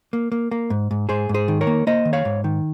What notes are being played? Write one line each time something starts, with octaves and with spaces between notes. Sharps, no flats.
A#3
A#3
A#3
G#2
G#2
G#2 G#4 C5
G#2
G#4 C5
D#3
A#4 C#5
A#3
A#3 C5 D#5
D#3
C#5 F5
G#2
D#3